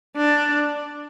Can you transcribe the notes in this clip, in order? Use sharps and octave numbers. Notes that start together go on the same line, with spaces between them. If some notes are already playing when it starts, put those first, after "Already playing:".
D4